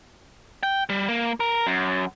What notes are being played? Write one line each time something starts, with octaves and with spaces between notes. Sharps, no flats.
G5
G3
A#3
A#4
F#2